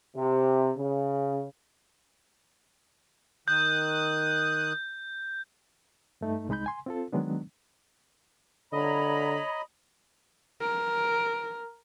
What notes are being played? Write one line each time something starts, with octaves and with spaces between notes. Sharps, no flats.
C3
C#3
D#3 D#6 F#6 G6
G2 A3 D#4
C2 G#3 D#4 B5 G6
G#5 C6
C4 F4 A4
D#3 F#3 G#3 B3 D4
D3 C#5 D#5 A#5 B5
A#4